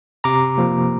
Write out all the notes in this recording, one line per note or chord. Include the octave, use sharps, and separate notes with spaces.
C3 A#5 D6
F3 A#3